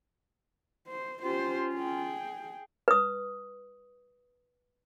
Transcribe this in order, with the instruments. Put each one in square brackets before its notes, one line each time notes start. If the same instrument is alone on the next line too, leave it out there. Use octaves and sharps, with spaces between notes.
[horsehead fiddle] C5
[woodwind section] C#4 F4 [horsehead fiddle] G4 C5
[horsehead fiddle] G#4 G5
[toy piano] B4 D#6